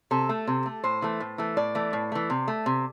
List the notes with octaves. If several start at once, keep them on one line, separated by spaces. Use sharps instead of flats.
C3 A4
A3
C3
A3
A2 C5
E3 A3
A2
E3 A3
A2 D5
E3 A3
A2
E3 A3
C3
A3
C3